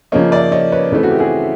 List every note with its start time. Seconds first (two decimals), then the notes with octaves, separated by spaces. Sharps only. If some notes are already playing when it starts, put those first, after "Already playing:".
0.12 C#3 F3 A#3 C#5 D#5
0.32 D5 E5
0.52 C#5 D#5
0.72 B4 C#5
0.92 C#3 E3 A3 C4 A4 B4
1.03 F#4
1.11 G4
1.19 F#4 G#4